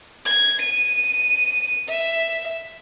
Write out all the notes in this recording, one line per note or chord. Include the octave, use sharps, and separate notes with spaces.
G#6
D#7
E5